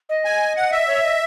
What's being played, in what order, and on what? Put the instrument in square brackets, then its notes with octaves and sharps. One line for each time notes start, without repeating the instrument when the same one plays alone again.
[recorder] D#5
[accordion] G#5
F#5
E5
[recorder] C#5
D#5